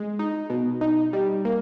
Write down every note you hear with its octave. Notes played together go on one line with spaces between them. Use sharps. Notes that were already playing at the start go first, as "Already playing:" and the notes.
Already playing: G#3
D#4
B2
D#4
G3
A#3